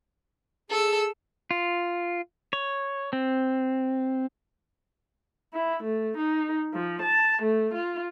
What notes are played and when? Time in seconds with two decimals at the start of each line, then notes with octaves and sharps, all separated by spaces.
0.70 G#4 A4 E6
1.51 F4
2.53 C#5
3.13 C4
5.53 E4
5.83 A3
6.17 D#4
6.74 F3
7.02 A5
7.42 A3
7.74 F4